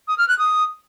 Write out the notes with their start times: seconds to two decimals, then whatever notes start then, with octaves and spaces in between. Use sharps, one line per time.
0.08 D#6
0.18 F6
0.28 F#6
0.39 D#6